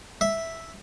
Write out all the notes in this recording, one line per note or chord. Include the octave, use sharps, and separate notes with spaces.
E5